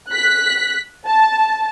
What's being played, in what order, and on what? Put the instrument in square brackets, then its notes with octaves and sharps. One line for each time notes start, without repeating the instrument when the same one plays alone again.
[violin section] F#6 B6
A5